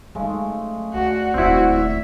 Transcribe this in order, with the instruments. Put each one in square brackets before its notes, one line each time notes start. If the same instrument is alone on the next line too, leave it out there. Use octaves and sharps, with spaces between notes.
[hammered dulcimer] C#3 G#3 A3 [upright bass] F#3 D#4
[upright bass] D2 [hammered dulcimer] D4 [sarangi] F#4
[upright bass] D#1 D2 [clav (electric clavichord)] C4 E4 [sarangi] F#4
[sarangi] E5